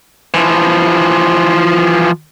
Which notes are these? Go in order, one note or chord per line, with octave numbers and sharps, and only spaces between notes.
E3 F3